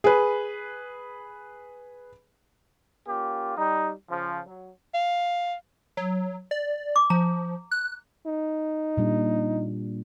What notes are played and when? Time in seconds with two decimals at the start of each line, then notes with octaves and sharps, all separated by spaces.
0.04 G#4 B4
3.08 A#3 C#4 F4 G4
3.58 G3 D#4
4.10 C#3 F3
4.47 F#3
4.94 F5
5.97 F#3
6.51 D5
6.96 D6
7.10 F3 A#5
7.71 F#6
8.26 D#4
8.97 A#2 G3 D4